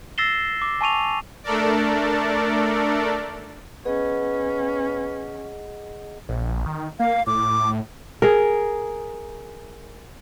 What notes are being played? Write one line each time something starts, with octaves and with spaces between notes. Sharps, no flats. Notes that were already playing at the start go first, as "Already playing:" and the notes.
E6 A6 A#6 C7 E7 G7
D6
G#5 A5 C#6 D#7 F7
A3 D4 A4 A#4 D5
B3 C#4 G#4 D#5 F#5
A#1
D#3
A#3 F5
A2 D6
G#4 A#4